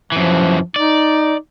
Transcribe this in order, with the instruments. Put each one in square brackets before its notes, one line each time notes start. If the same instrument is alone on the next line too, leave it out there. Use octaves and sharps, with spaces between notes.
[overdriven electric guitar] F#2 E3 [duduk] F3
[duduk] D#4 [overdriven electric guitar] D5